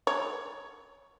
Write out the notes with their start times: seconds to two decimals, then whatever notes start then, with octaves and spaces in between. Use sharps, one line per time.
0.07 C#5